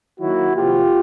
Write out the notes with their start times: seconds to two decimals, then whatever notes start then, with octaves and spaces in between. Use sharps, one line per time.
0.20 D#3 F#3 A#3 E4 F#4
0.55 C3 F3 A#3 F4 G4